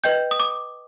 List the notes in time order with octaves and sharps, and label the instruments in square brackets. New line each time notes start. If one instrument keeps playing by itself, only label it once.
[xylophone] B4 D#5 G5 G6
D#6
D6